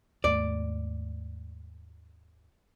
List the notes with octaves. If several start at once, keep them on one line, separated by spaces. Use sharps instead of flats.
D#2 G#2 A3 D5